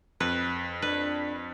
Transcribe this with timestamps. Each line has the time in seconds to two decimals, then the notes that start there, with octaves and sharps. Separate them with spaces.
0.20 F2 B4
0.82 D4 B4